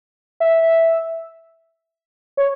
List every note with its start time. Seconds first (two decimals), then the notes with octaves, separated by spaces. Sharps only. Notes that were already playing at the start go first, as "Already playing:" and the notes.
0.40 E5
2.37 C#5